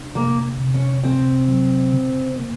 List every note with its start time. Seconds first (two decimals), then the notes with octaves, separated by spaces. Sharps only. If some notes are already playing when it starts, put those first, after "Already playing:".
Already playing: D4
0.15 C3 A#3
0.59 C3
0.74 C#4
1.03 C#2 C4
1.48 F#3
1.92 C#3
2.36 A#3